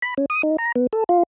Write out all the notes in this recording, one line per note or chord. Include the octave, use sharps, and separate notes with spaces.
B5
C#4
D#6
D#4
A#5
B3
A4
F4